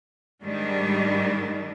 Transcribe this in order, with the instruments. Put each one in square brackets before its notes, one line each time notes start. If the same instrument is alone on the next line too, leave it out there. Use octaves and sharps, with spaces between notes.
[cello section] G#2 D#3 G3 D4